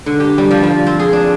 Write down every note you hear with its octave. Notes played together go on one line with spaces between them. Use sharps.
D3
G4
G3
F3
F3
C4
G#4
D4